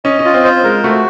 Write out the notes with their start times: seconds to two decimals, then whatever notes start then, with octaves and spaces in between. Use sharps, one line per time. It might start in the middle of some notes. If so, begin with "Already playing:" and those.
0.05 C#4 D#5
0.19 C#4
0.25 F4
0.34 C4
0.44 C5
0.63 G#3 A#4
0.83 A3 F#4